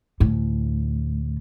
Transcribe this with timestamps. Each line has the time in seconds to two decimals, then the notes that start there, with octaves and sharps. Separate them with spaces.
0.20 D2 A2